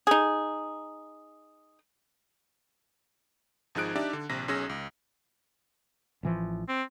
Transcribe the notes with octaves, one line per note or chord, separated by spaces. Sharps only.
D#4 G#4
G#1 F3 D#4 G#4 F#6 D7
D4 D#4 G4 D5 E5
D3
A#1 C3 A#6
B1 C#4 G#4 E6 A#6
C#2
A1 E3 F3
C4